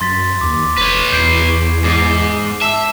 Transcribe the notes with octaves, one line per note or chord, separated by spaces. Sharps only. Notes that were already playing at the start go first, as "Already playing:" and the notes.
F#2 C6 A6 B6
D#2 D6
F1 B4 C#5
E2 G6 C7 D7
G#2 D6 C7 D#7
E5 A5 E6